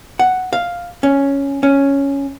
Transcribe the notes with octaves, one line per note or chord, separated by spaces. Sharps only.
F#5
F5
C#4
C#4